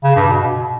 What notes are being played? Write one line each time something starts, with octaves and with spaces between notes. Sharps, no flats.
C#3
G2
B2